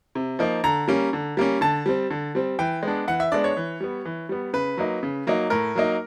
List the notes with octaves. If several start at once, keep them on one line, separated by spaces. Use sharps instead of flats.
C3
F3 A#3 D#4
D3 A#5
G3 A#3 C#4
D3
G3 A#3 C#4
D3 A5
G3 C4
D3
G3 C4
E3 G5
G#3 B3 D4
E3 F#5
E5
G#3 B3 D4 D5
C#5
E3
G3 B3
E3
G3 B3
C#3 B4
F#3 A#3 D#4
C#3
F#3 A#3 D#4
A2 A#4
F#3 A#3 D#4